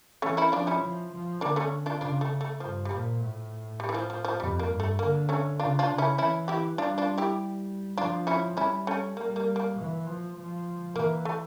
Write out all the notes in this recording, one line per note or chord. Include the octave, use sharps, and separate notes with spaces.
E3 A3 C#4
C#4 E4
F3 D4 F4
C#4 E4
F3
F3
D3 A#3 D4
A3 C#4
D4 F4
C#3 D4 F4
A3
A3
G2 F3
G3
A#2 F3
A2
G3
E3
F3
F3
F3
F2 G3
A#3
G2
A3
D3 A#3
A3 C#4
C#3 D4 F4
D4 F4
C#3
C#4 E4
E3 C#4 E4
E4 G4
G3 D4 F4
D4 F4
E4 G4
F3 D4 F4
C#4 E4
G3 C#4 E4
A3 C#4
G3 A#3
A#3
A#3
E3
F3
F3
E3 A#3
A3